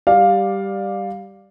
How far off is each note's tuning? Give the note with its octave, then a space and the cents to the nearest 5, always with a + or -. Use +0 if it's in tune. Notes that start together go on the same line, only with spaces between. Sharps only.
G3 +0 D5 +0 F5 +10